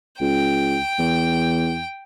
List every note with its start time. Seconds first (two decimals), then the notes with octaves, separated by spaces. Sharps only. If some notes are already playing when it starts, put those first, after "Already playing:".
0.21 C#2 G5
0.99 E2